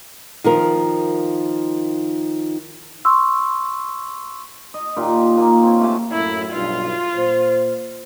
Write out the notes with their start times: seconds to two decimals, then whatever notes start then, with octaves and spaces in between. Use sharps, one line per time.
0.44 D#3 F3 A#4
3.05 C6 C#6 E6
4.74 D#5
4.96 A#2 D#3 F4 G4
5.37 A#3 G#5
5.63 C4 C#5
5.80 C#3 A3 G4 A5
6.12 F#2 A2 E4
6.53 B1 G2 F4
7.15 A#2 C5